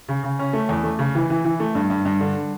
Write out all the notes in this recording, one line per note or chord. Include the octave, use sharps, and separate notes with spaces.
C#3
C#3
C#4
A3
E2
A3
C#3
E3
E3
E3
A3
G2
G2
G2
D3